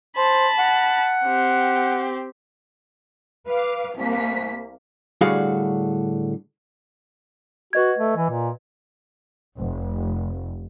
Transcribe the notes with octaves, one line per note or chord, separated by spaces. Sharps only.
C5 A5 B5
F#5
C4 G4
B4 F5 D6
C2 A#3 B6
A2 D3 G3 F#4 G#4 F5
F#4 B4 D#5 G#6
A3
E3
A#2
F1